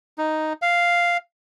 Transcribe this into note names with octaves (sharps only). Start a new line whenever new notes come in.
D#4
F5